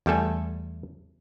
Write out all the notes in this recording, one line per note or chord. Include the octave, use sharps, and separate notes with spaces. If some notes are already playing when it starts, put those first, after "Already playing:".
E2 G3 A3 A4 G#5